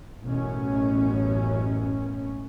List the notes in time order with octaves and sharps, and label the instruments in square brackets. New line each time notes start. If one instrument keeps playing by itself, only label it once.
[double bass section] A1 F#2 B2 C#4